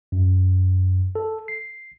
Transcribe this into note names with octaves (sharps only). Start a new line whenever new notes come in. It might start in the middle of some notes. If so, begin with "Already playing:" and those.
F#2
A4
C7